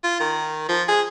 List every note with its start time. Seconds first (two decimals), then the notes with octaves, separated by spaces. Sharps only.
0.04 F4
0.20 D#3
0.69 F3
0.88 G#4